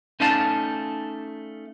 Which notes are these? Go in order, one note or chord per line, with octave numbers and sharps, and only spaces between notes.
A3 C#4 D#4 D5 F5 A5